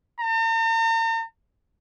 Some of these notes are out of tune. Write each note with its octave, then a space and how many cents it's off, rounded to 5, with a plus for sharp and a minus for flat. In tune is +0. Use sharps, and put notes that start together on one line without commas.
A#5 -45